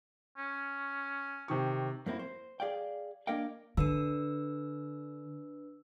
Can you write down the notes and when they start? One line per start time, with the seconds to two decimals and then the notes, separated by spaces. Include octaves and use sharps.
0.37 C#4
1.48 C3 D#3 C#6
2.06 F#2 A#3 C4 E4
2.19 C5
2.60 G#4 D5 F5 G5
3.27 A#3 D4 A#4 D#5 F5 G5
3.77 D3 D4 B4 E6